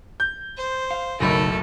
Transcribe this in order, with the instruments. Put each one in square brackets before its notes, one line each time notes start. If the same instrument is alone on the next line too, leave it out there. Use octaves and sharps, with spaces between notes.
[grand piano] G6
[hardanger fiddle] C5
[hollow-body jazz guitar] F5
[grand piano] F#1 B1 B5 [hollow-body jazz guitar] C#3 D#4 A#4 [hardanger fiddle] A3 A4